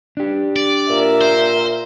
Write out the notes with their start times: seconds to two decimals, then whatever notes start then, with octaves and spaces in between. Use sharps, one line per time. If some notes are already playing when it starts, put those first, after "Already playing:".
0.17 D4 G4
0.56 D5
0.90 A#2 A#4 E5
1.21 C5